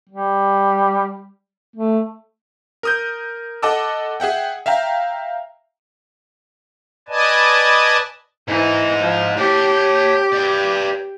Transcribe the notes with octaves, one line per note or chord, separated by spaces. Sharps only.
G3
A3
A#4 D#6 G6
A4 D#5 F#5 A5 D6 E6
G#4 E5 F#5 G5
E5 F5 G5 A#5
B4 D5 D#5 G#5 A5
G#2 E3 D#4
F3
G4 C#5 A5
B4 D5